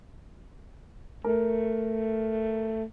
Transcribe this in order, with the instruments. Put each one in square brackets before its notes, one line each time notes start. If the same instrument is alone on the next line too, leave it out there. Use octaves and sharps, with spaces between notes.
[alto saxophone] A3 [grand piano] A#4